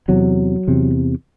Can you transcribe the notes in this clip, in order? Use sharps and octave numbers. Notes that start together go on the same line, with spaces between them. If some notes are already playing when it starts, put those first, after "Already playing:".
E2 C3 F#3
E2 C3